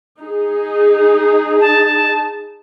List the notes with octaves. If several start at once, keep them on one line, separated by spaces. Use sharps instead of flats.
D#4 G#4
A5